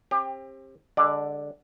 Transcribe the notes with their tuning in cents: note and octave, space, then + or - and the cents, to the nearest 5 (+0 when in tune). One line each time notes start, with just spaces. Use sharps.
C4 +35 G4 +25
D3 +0 G#3 -30 D5 +0